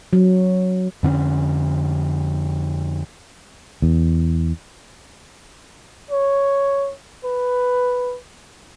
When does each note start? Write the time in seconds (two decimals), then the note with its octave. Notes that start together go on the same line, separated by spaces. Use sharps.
0.13 F#3
1.03 F2 D3 C4 C#4
3.82 E2
6.11 C#5
7.25 B4